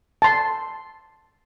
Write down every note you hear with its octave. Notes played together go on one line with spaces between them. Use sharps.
A5 C6